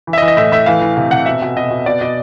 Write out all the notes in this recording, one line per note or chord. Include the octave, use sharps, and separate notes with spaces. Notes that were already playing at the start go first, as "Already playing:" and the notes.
E3
E5
D#5
E3
D#5
A2 E5
A2 E5
E3 F5
E3
C3 F5
C3 F#5
B2 E5
B2
B2 D#5
B2
B2 D5
B2 D#5